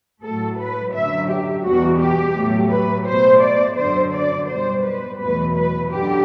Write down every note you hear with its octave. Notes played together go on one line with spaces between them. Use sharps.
A2 F#3 A3 A4
B4
F#2 D3 F#3 E5
G4
E2 B2 G3 F#4
G4
A2 F#3 A3
B4
B2 A3 C5
D5
F#2 D3 F#3 C5
D5
B2 G3 C5
B4
E2 B2 F#3 A3 B4
B4
F#2 D3 G4